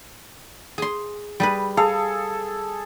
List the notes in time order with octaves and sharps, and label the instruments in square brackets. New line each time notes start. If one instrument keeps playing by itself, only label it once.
[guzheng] G#4 C6
G3 G#4 B4
[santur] G#4 A4 [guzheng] F5